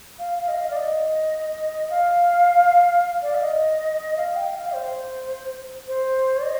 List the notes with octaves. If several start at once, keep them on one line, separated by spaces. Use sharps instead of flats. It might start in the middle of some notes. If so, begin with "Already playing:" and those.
F5
F5
D#5
F5
D5
D#5
F5
D5
F5
D#5
F5
G5
F5
C5
C5
D#5